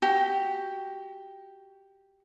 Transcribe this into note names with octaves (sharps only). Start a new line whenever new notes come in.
F#4 G4